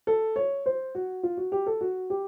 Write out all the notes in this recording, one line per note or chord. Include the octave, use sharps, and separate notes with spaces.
A4
C#5
C5
F#4
F4
F#4
G4
A4
F#4
G4